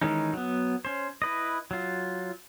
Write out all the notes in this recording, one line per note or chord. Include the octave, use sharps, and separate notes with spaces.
D#3 E3 G#3 C#4 D#4
F#3 B3
C#4 C5
E4 B4 D#5
F#3 F4